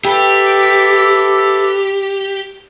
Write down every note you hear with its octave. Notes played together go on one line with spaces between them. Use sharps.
G4 A4 B4 E5